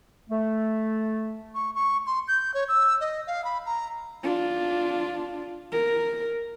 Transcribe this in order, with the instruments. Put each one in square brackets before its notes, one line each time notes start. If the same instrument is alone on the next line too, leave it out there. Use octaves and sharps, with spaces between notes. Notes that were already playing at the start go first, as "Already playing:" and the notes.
[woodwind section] A3
[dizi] C#6
C#6
C6
G6
C#5
E6
D#5
F5
B5
A#5
[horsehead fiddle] D4 F4
A#4